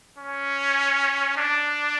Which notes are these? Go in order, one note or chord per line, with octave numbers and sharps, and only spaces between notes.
C#4
D4